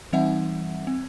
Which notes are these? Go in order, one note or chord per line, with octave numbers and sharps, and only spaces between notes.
E3 G3 C4 D#4 E5 F#5
C4